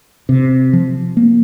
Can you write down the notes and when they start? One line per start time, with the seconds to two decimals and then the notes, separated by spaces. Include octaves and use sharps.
0.29 C3
0.73 F3
1.17 A#3